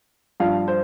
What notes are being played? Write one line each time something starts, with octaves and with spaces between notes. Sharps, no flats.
G2 F3 F5
C5